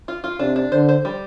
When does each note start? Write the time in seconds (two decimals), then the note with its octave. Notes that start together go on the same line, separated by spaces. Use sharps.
0.08 F4
0.24 F4
0.39 C3 D4
0.56 D4
0.72 D3 C5
0.89 C5
1.05 G3